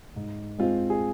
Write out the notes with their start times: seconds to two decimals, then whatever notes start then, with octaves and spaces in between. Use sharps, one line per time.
0.16 G#2
0.58 G#3 C4 F4
0.90 G#4